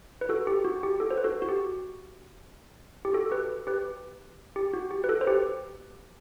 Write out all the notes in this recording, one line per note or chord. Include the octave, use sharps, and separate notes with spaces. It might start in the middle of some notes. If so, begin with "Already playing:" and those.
B4
F#4 A4
G4
F#4
G4
F#4 A4
C5
B4
F#4 A4
F#4
G4
G4
F#4 A4
A4
G4 B4
G4 B4
G4
F#4
G4
B4
F#4 A4
C5
G4 B4